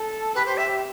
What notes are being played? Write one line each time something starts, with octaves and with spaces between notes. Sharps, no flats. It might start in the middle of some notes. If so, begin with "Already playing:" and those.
Already playing: A4
G4 B4
C5
E5